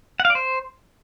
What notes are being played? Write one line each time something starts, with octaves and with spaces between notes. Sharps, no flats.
F#5
F5
D5
C5